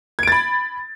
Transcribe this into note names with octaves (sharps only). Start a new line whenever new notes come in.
B5 G#6 A6 D7